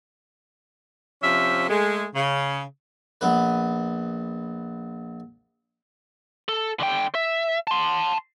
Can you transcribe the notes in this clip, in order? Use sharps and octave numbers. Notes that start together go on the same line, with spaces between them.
C3 F3 C#4 E5
G#3 A3
C#3
A#1 B3 B4
A4
D3 G5
E5
A5 C6